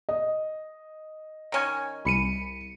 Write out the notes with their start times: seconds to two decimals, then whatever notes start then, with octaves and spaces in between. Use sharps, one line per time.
0.09 D#5
1.52 D#3 C#4 G#5
2.05 C2 B5 C#7 D#7